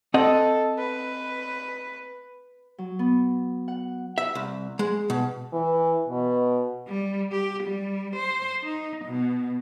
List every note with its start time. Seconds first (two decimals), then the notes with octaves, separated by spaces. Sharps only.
0.14 C4 A4 D#5 F#5
0.79 B4
2.78 F#3
2.99 B3
3.68 F#5
4.18 E5
4.35 C2
4.79 G#3
5.10 B2
5.53 E3
6.09 B2
6.88 G3
7.32 G4
7.63 G3
8.16 C5
8.63 D#4
9.05 B2